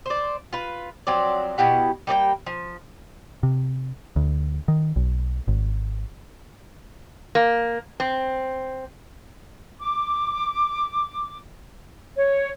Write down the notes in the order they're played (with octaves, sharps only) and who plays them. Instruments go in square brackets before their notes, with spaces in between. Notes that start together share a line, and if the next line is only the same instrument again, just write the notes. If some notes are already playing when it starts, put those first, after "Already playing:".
[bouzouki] C5 D5
F4 B4
F3 F#3 C4 D5
B2 E4 G4 F#5
G3 A#3 D5 G5
F3
[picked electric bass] C3
D2
D#3
B1
G#1
[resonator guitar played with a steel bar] A#3
C4
[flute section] D6
C#5